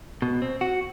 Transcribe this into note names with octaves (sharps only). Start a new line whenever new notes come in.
B2
C4
F#4